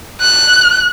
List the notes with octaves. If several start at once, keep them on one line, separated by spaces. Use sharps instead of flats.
F#6